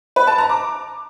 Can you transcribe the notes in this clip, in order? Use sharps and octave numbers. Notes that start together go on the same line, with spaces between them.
B4
A5
A#5
D6